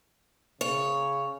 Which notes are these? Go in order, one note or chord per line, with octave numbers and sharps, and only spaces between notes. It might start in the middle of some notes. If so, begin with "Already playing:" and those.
C#3 C#5